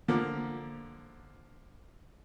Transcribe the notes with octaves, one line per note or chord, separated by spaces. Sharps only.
D3 F3 A#3